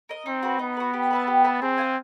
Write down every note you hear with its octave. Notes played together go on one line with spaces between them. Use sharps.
A#4 D#5
C4 D#4
F#4 B4
B3 D#4
F#4 B4
G4
B4 E5 A5
G4
B4 E5 A5
C4 G#4
C5 F5 G#5